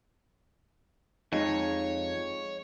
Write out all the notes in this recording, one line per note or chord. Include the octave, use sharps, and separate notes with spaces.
F2 G#3 D#4 C#5